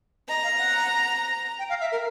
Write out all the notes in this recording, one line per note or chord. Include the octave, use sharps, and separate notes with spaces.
D#5 A#5
F5
F#5
G5
F5
E5
A#4